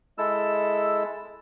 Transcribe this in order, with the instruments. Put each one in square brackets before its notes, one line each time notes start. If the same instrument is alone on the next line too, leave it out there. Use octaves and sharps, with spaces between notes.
[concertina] G#3 E4 A4 E6